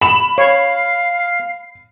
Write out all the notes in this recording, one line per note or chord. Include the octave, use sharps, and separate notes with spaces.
B5 E7
C#5 F5 C7